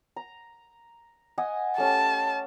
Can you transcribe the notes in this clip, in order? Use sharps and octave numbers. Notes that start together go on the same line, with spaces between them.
A#5
D#5 F#5 G#5
A3 C#4 G4 A5